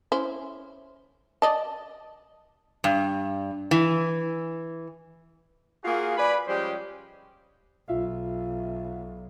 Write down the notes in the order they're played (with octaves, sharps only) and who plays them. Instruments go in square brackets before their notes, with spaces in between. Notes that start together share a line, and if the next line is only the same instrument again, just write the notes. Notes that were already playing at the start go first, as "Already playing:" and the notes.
[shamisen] C#4 E4 C5
D5 D#5 A5
[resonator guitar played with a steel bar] G2
E3
[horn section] A#3 F4 F#4 G#4
B4 D5 G#5 B5
F3 G3 G#3 C#4 G4 C5
[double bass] B1 [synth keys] F4 E5 F5